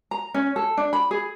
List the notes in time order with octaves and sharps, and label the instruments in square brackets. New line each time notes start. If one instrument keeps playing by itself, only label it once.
[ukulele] A#5
C#4
A4
D4
B5
G#4